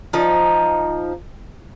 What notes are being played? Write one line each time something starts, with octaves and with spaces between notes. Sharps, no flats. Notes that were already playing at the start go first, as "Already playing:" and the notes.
F3 D#4